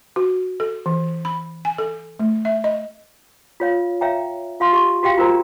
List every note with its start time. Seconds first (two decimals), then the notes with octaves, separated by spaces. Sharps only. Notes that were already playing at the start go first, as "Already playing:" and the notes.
0.16 F#4
0.60 A4
0.86 E3
1.25 B5
1.65 G#5
1.78 A4
2.20 A3
2.45 E5
2.64 D#5
3.60 F4 C#5 F5
4.01 C#5 E5 F5 G5 A#5
4.60 F4 F5 C6
4.73 G4 C6 C#6
5.03 F#4 G4 F5 G5
5.18 F4 A#4 C5 A#5